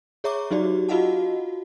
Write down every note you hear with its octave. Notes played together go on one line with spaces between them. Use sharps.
G#4 C#5 E5 A#5 C#6 D6
F#3 D#4 F#4 G4 D5
F4 F#4 D#5 F5 F#5 A5